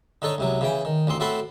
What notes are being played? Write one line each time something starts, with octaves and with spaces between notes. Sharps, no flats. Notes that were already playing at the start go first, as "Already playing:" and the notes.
D3 D#4 A4 C#5 C#6
C#2 C3 F#3
C#3 E3 G5
D#3
A1 D2 C4 C6
A2 C4 F#4 A4 B5 C6